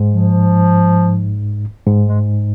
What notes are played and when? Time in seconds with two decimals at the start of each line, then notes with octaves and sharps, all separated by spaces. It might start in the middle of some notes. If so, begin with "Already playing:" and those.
Already playing: G#2
0.12 F3
1.87 G#2
2.07 G#3